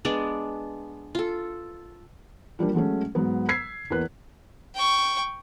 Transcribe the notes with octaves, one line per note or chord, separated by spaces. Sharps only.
G#3 B3 D4 D5
F4 A4
F3 G3 A#3 D4
F#3 G#3 A3 C#4
G#2 F#3 B3
E6 G#6 B6 C7
E2 A#3 B4 F#6
G5 C#6